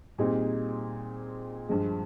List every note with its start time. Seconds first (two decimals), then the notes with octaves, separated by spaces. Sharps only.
0.18 A#2 G3 C4 D#4 G#4
1.69 G2 F3 G#3